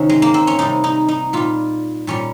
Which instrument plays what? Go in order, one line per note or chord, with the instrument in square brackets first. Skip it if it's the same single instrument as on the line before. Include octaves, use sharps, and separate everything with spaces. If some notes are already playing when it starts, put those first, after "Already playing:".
Already playing: [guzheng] C3 D#3 C#4 D#4
G#3
A#3
C4
C#4
C3 G3 D#4
D#4
D#4
A#2 G3 F4
A#2 G3 C#4